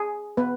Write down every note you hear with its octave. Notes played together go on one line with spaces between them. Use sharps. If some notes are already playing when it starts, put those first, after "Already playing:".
Already playing: G#4
B3 B4